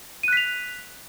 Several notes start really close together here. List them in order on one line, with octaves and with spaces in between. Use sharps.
D#7 F#6 B6 F7